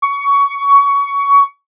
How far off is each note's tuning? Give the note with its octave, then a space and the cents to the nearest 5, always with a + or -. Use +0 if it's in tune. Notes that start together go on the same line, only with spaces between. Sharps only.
C#6 +20